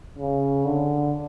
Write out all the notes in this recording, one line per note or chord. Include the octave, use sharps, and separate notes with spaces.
C#3
D3